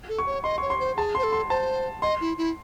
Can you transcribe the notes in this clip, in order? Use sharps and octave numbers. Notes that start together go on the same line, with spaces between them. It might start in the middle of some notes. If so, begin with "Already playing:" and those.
A4
C#6
C#5
D#5 C6
C#5 C#6
C6
C5
G#4 A5
C5 C6
A4
C6
C5 A5
D#5 C6
E4
E4